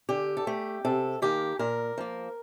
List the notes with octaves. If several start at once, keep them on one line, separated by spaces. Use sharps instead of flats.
D3 G4
A4
A3 G4
C3 A4
D#3 A#3 G4
A#2 A#4
F3 A#3